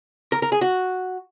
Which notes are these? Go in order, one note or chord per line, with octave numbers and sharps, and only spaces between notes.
A#4
A#4
G#4
F#4